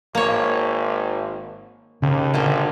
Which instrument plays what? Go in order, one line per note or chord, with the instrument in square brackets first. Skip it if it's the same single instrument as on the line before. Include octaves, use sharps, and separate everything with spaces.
[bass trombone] G#1 [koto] A#3 C#5
[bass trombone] D#2 [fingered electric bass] C#3
[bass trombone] G#1 [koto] A#2 D3